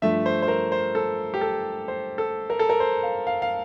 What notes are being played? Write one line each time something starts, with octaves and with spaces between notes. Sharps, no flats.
G2 F3 A3 E5
C5
C5
A#4
C5
A4
G4
A4
C5
A4
A#4
A4
A#4
C5
F5
F5
F5